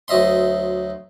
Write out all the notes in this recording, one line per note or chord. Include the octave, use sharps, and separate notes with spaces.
D2 F#3 D#5 E5 C6